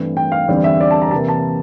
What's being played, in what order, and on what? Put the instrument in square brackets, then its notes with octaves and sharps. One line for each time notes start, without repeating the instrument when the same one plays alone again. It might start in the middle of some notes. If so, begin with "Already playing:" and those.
Already playing: [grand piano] G2 E3 A3 C4
G5
F5
E2 D3 G3 C4
E5
D5
A5
A#5
C3 E3 A#3 A5
A5